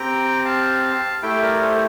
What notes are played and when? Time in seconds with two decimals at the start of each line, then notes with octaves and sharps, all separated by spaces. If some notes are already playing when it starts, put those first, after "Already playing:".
Already playing: C4 G4 G5 A#5
0.45 F5 A5
1.23 A3 E4 G4 E5 G5
1.42 A#4 D5
1.62 A4 C5